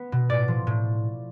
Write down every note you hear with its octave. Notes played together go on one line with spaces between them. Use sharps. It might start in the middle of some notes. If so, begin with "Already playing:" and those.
Already playing: B3
B2
A2 D5
F3
A2